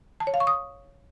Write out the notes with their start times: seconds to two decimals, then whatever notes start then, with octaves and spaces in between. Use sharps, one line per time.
0.20 A5
0.27 C#5
0.34 F5
0.40 C#6
0.47 D#6